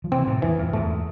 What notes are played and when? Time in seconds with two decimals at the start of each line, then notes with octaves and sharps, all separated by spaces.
0.04 F3
0.12 C3 E3 C4
0.27 A2 C3
0.42 E2 E3
0.58 F2
0.73 E2 G#2 A3